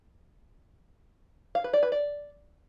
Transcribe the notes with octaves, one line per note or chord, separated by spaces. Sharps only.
F5
B4
D5
B4
D5